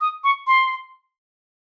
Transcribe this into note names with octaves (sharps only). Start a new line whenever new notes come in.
D#6
C#6
C6